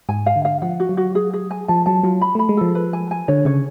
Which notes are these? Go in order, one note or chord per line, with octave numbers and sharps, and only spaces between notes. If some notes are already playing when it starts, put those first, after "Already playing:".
G#2 G#5
F5
D3
F5
F3 F#5
F#4
F#3
F#4
G#4
G#4
G#5
F3 A5
F#3 A5
F#3 F4
B5
A3 B5
G#3
F3 A4
B4
G#5
G#5
D3 C#5
C#3 C#5